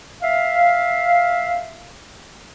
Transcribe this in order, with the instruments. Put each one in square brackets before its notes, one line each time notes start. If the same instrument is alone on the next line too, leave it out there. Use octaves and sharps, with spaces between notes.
[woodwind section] E5 F5